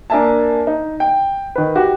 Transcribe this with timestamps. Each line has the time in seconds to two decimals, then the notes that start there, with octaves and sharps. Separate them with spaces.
0.10 A#3 D4 A#4 E5 G#5 A5
0.67 D#4
1.00 G5
1.56 D#3 B4
1.76 F#4 G4